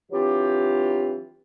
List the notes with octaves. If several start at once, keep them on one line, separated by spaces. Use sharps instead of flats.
E3 F#3 C4 D4 F4 G4